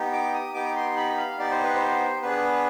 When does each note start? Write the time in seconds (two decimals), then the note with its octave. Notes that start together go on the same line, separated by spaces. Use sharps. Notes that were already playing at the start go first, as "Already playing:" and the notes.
Already playing: B3 D#4 G4
0.13 D6
0.34 D#6
0.54 B3 D#4 G4 D6
0.76 C6
0.96 B5
1.17 F5
1.39 B3 D#4 G4 D5
1.51 C5
1.64 B4
1.75 C5
2.22 B3 D4 G#4 B4